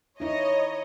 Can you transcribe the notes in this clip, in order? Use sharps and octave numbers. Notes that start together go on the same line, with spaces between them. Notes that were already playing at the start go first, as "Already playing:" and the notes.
D#4 E4 C#5 D#5